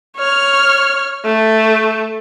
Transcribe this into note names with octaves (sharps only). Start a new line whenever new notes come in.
C#5 F6
A3